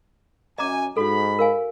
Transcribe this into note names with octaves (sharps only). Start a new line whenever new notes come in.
F#2 D#5 G#5 A#5 D6
G#2 F#4 A4 B5
A#4 F5 G#5